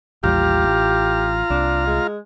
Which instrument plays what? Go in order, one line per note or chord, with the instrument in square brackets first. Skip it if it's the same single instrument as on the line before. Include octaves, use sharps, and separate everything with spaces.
[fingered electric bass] A1 D#2 G3 [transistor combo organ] F4 F5 A#5 [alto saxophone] G4
[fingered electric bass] A1
[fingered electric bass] C2 [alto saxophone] D4
[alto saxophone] G#3